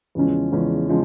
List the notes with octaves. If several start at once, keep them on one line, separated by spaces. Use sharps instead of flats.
E2 C#3 F3 G#3 C#4
E2 C#3 F3 G#3 C#4
C#3 F3 G#3